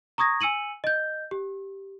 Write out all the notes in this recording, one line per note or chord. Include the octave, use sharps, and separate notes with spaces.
A#5 C#6 D#6 G#6 A#6
G#5 E6 C#7 D#7 F#7
D#5 G6
G4